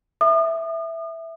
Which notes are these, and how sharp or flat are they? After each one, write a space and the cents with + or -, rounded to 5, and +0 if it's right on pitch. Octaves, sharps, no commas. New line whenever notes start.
E5 +0 D#6 -40